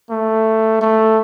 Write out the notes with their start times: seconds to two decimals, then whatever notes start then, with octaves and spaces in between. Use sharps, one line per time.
0.10 A3
0.82 A3